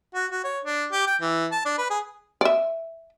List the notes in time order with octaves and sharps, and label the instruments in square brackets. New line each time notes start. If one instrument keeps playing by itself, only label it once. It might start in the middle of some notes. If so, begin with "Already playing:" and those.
[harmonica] F#4
F#4
C#5
D4
G4
G5
E3
A5
D4
B4
G#4
[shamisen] D5 E5